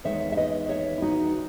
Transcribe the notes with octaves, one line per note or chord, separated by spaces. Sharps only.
E2 D#3 G#3 C#5 E5
E5
B4 D#5
C#5 E5
E4
D#4 F#4